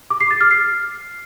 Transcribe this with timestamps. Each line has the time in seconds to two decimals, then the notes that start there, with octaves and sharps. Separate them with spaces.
0.10 D6
0.21 C7
0.31 A6
0.41 F6
0.51 C7